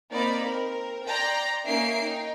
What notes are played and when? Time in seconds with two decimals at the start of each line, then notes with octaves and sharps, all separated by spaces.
0.10 A#3 C4 D#4 D5 B5
0.45 C4 A#4
1.06 D5 G5 A#5 C6 G6 A#6
1.66 A#3 C#4 D#4 E5 C7 D7
2.03 D#4 G5